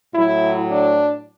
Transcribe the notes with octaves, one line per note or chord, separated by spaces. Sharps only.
A2 F#3 E4
D4